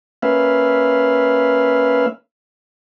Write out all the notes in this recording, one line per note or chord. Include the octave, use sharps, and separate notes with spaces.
A#3 C#4 B4 E5 F5